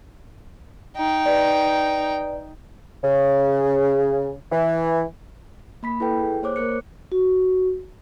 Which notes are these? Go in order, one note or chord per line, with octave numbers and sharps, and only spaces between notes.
D#4 G5
B4 D5
C#3
E3
A#3 B5 B6
E4 A4 B4 G5
G#4
A#3 C5 C#5 D6 F#6
A#3 A#4 F#6 C#7
F#4